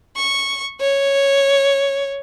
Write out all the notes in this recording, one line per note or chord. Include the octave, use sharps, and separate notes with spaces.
C#6
C#5